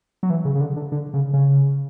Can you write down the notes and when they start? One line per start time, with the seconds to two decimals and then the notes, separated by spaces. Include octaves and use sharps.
0.23 F#3
0.30 E3
0.45 C#3
0.55 C#3
0.61 D3
0.76 D3
0.92 D3
1.14 C#3
1.34 C#3